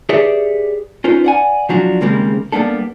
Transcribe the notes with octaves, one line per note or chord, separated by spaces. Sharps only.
G4 G#4 B4 C#5 D5 E5
C#4 D#4 F4 B4 C5
D5 F#5 G#5
F3 F#3 D4 F#4
D#2 C#3 G3 G#3 A#3 C4
G3 A#3 B3 D4 A4